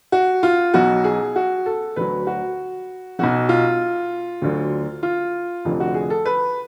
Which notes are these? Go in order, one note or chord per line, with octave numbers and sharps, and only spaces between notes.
F#4
F4
B1 B2 F#3 F#4
G#4
F#4
A4
D2 D3 F#3 B4
F#4
B1 B2 F#3 F#4
F4
D2 D3 F#3
F4
F1 F2 D3 F3
F#4
G#4
A4
B4